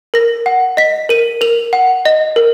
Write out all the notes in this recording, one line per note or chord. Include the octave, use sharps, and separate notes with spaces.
A#4 A#6
F#5
D#5 B6
A#4 D#7
A#4 F7
F#5
D#5
A#4